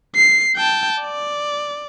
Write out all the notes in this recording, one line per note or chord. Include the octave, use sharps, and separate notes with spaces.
C7
G5 A5
D5